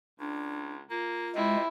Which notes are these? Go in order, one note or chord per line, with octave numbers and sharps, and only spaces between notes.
C#2 D4
A#3 F4
C3 G#3 E4